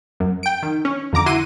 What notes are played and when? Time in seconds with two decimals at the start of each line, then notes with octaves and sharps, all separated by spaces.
0.20 F#2
0.43 G5 D7
0.63 D#3
0.85 C#4
1.13 F2 D3 A#5 D6
1.26 E4 F#4 C6 D#7